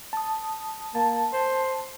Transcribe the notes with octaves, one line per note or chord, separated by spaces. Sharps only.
A5 D#6
A#3 A5
C5